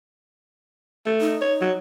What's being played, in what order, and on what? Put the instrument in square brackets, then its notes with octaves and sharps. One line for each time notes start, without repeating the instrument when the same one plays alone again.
[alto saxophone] A3
[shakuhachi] D#4
[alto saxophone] C#5
F#3